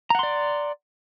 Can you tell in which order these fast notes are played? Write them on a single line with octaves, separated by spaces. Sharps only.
A#5 F#5 C6 D5